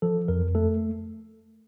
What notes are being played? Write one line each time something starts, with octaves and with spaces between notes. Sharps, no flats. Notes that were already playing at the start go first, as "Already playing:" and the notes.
F3 A4
F2 A#4
A3 A4